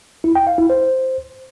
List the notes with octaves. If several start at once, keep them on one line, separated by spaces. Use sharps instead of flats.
E4
G5
F5
E4
C5